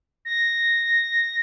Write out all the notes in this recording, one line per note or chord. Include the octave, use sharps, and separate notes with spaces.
A#6